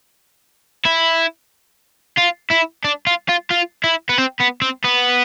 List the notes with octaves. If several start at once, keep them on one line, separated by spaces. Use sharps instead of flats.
E4
F4
E4
D4
F4
F4
F4
E4
B3
C4
B3
C4
B3